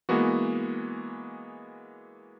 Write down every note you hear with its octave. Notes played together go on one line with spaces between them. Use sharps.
E3 G#3 A#3 B3 F#4